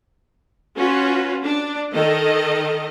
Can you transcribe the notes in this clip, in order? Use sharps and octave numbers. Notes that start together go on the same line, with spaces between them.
C#4 F4 F#4 B4
D4
D#3 A4 D#5